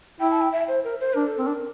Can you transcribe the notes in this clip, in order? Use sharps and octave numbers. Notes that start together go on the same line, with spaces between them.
E4 G5
A5
G5
E5
C5
A#4
C5
D4 A#4
A4
C4 A#4
D4